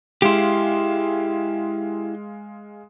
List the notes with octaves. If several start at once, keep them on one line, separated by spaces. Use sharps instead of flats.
G#3 E4 G4 F5 C6